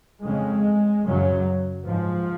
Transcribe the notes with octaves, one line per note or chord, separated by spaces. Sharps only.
F2 C#3 G#3
F#2 C#3 F#3
G#2 F3